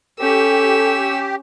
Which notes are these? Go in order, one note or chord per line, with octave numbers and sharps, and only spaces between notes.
C#4 G4 A4 E6